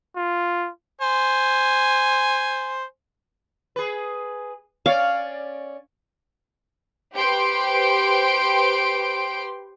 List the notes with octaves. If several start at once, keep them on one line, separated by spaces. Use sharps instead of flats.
F4
C5 G#5
G#4 B4
C#4 C#5 D5 F5
G4 B4 C5 G5 C6 D7